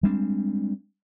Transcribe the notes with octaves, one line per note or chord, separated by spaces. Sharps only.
G3 G#3 C4 D4